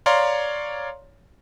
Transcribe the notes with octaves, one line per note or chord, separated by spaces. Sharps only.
C#5 D5 F5 A#5 C6